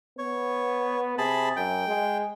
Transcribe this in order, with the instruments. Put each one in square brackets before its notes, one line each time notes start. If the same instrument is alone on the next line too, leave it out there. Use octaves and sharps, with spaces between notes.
[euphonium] B3 [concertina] C#5
[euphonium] C3 [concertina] G#4 A5 B5
[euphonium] F#2 [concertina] G5
[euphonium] G#3